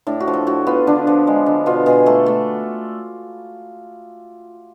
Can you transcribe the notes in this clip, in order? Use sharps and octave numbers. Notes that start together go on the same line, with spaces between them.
A2 D4
F#4
F3
A4
A2 F#4
B3 F4
D3 D4
F3
G#3
D3
B2 F4
B2 G#4
A3 A4
A3